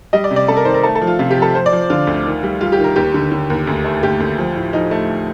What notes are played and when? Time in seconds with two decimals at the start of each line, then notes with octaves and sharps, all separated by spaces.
0.13 G3 D#5
0.24 D5
0.31 C3
0.36 D5
0.48 C3 A4
0.57 A#4
0.65 D#3 C5
0.74 A#4
0.83 A3 A4
0.95 A4
1.02 F3
1.07 F4
1.19 C3 F4
1.31 G4
1.37 F3
1.42 A4
1.55 F3 C5
1.66 D5
1.72 F3
1.90 D3 F4
2.07 D2
2.26 D#3
2.43 G3
2.61 G3 F4
2.72 G4
2.78 D#3
2.84 A#4
2.96 D#2 G4
3.14 D3
3.32 D3
3.50 D#2
3.67 D2
3.84 A3
4.03 D2 G4
4.20 D2
4.38 F3
4.56 A2
4.73 F3 D#4
4.91 A3